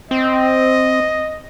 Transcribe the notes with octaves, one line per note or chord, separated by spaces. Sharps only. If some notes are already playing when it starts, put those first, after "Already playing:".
C4 D#5